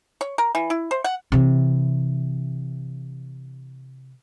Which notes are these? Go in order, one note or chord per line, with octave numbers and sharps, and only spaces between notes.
C#5
A#4
E3
E4
C5
F#5
C3 E3